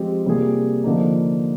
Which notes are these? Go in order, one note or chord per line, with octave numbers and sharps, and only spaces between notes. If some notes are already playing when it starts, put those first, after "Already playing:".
Already playing: F3 G#3 C4 G4
C3 G3 A#3 F4 G#4
D3 F3 A#3 D#4